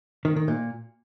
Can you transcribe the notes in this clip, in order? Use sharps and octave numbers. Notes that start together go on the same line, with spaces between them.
D#3
D#3
A#2